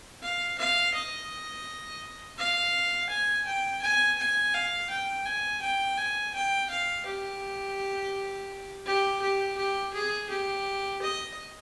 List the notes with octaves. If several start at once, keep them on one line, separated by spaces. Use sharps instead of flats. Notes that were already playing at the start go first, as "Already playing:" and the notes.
F5
F5
D#5
F5
G#5
G5
G#5
G#5
F5
G5
G#5
G5
G#5
G5
F5
G4
G4
G4
G4
G#4
G4
D#5